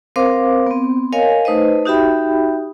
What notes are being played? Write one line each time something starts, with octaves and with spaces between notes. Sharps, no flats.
C4 A#4 C5 F5 D6
B3 C4
A#4 C#5 D#5 F5 G#5
A3 D#4 B4 C5 D#5
D#4 F#4 G4 E5 G5 B5